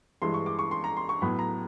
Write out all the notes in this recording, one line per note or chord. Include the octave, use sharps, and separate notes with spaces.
G2 E3 G#3 C6
C#6
D6
C#6
C6
A#5
C6
C#6
A2 F#3 B3 B5
A#5